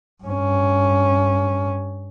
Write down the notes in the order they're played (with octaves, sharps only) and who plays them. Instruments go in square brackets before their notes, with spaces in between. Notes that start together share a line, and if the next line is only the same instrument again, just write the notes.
[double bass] G2 C#4